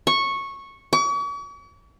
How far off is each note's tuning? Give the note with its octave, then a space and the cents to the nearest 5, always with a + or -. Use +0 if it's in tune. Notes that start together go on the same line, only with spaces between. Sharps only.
C#6 -10
C#6 +45